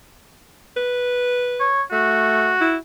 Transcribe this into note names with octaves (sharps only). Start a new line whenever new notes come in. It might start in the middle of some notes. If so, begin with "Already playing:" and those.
B4
C#5
A3 F#4
E4